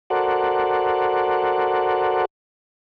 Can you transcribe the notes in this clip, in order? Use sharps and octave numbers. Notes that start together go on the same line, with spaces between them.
F#4 A4 A#4 C5 D5 F#5